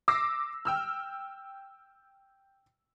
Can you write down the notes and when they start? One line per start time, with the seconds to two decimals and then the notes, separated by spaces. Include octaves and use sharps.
0.08 D6 E6 A#6 C7
0.65 G5 E6 F6